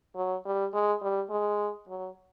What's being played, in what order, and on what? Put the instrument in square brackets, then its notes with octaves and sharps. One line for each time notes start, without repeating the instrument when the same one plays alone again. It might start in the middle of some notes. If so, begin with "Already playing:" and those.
[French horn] F#3
G3
G#3
G3
G#3
F#3